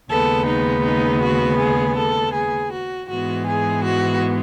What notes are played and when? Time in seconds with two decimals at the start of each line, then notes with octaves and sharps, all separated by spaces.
0.10 D#2 C#3 G#3 B3 A4
0.47 D#4
0.84 D#4
1.22 F#4
1.60 G#4
1.97 A4
2.34 G#4
2.72 F#4
3.09 G#2 E3 G#3 B3 F#4
3.47 G#4
3.85 F#4